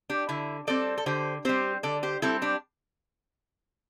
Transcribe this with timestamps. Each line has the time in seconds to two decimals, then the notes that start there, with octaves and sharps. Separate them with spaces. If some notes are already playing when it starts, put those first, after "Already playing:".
0.10 D4 G4
0.29 D3 E4
0.67 G3 C4 A4 D5
0.98 A4
1.06 D3 G4 C5
1.45 G3 C4 G4 C5
1.83 D3 A4 D5
2.03 G4 C5
2.22 G3 C4 E4 A4
2.42 D4 G4